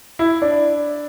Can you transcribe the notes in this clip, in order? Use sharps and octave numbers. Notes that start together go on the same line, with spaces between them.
E4
D4